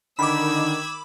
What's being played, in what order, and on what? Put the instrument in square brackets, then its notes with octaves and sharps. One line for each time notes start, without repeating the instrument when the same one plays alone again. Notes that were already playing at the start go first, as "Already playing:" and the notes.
[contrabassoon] D3 [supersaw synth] D#3 [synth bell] B5 D6 [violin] E6 G#6